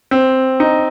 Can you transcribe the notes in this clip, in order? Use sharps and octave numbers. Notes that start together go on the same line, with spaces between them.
C4
D#4